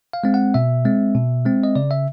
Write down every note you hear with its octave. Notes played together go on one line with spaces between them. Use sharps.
F5
G#3 C4
F#5
B2 E5
G#3 C4
B2
G#3 C4
D#5
C#3 D5
E5